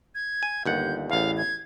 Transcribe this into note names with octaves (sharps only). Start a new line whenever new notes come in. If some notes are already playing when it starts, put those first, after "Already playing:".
G#6
G#5
G1 D#2 F#5 G6
A1 E2 F5
G#6